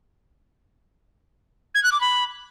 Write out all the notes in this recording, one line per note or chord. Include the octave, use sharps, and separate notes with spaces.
G#6
F#6
D6
B5